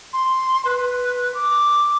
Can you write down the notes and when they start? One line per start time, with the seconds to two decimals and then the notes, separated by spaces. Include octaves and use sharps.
0.13 C6
0.65 B4
1.34 D6